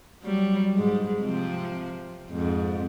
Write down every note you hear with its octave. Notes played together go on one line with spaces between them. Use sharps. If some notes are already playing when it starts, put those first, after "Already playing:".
F#3 G3
G#2 G#3
C3 F3 C4
F2 G#2